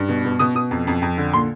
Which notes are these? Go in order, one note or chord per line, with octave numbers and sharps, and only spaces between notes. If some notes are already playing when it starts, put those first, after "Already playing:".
Already playing: G2
B2
B2
B2 D#6
B2 D#6
F2
F2
F2
D3
A#2 C6